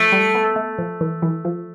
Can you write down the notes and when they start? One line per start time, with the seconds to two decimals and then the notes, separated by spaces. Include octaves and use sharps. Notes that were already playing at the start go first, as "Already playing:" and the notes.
Already playing: F3 A3
0.12 G3
0.35 B3
0.56 A3
0.79 F3
1.01 E3
1.22 E3
1.45 F3